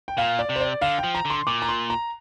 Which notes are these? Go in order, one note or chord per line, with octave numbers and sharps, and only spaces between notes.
G5
A#2 F5
D5
C3
C5
D5
D3 F5
G5
F3
A#5
D3
C6
A#2 D6
A#5
C6
A#5